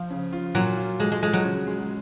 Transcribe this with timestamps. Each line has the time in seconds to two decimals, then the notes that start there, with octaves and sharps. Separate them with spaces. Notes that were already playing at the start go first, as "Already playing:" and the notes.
Already playing: F3
0.10 C#3
0.33 F4
0.55 A#2 F#3
0.77 F4
1.00 F3 G#3
1.11 G#3
1.23 F3 G#3
1.33 F#3
1.45 C#3
1.67 G#3